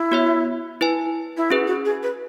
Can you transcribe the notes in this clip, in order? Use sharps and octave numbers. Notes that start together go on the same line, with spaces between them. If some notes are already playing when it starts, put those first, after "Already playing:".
Already playing: E4
B3 F#4 C#5 E5
E4 B4 G#5
E4
C#4 F#4 G#4 B4
F#4
G#4
B4